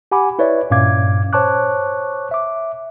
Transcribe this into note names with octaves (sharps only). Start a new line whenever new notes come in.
G4 F#5 G#5 B5 D6
E4 B4 C#5 D5 E5
G2 A#2 C#4 F5 D6 G#6
C5 C#5 A5 C#6 D6 F#6
E5 D6